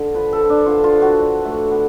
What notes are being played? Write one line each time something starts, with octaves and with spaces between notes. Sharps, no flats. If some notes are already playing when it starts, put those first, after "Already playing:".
Already playing: D3 D4
F3 B4
A4
F3
D4
D3 F4
F4
F3
F#4
D4
A3
B3